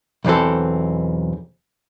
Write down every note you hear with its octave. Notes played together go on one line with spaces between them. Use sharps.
B1 E2 E3 C4 A4